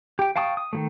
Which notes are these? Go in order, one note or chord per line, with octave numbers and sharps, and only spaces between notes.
G4 G5
F5 G5 A5 C#6 D#6
D#6
D#3 F#3 A3